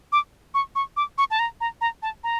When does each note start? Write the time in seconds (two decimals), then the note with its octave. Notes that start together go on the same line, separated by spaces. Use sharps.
0.12 D6
0.54 C#6
0.75 C#6
0.97 D6
1.18 C#6
1.31 A5
1.39 A#5
1.61 A#5
1.81 A#5
2.02 A5
2.24 A#5